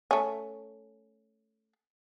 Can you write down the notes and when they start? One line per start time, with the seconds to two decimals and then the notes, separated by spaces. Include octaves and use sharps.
0.11 A3 C#4